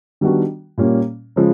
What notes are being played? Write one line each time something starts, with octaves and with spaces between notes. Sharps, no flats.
D#3 G3 B3 D4 F#4
A#2 G3 A#3 C#4
C#3 F3 G#3